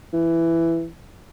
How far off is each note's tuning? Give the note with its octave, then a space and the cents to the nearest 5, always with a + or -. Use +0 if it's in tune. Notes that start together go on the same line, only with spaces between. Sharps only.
E3 +10